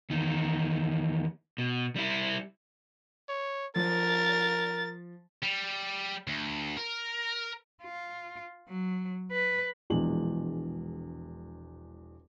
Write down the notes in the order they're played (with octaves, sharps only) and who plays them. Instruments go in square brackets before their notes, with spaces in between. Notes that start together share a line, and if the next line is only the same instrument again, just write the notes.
[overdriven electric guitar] E2 D#3
B2
G3 E4
[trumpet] C#5
[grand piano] F3 [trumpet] A#4 [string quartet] A6
[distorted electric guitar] G3
D2
A#4
[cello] F4
F#3
B4
[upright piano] E1 A#1 E2 G#3 F#7